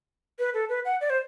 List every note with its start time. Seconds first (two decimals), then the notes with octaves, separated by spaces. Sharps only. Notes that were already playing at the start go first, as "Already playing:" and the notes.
0.39 B4
0.54 A4
0.69 B4
0.85 F#5
1.01 D5
1.10 C5